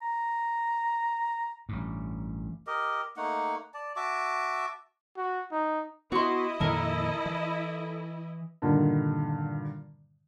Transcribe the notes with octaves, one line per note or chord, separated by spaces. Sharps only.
A#5
A1 G2
G4 A#4 D#5
A3 A#3 D#4 F#5
D5 A5
F#4 E5 A5 D6
F#4
D#4
B3 E4 F#4 D#5 C6
F2 A#2 D#3 A4 A#4
E3
G2 A#2 D3 D#3